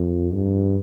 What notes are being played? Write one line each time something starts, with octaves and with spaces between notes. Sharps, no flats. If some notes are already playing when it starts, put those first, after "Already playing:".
Already playing: F2
G2